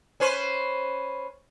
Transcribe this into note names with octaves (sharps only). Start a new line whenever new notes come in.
C#4 B4 C5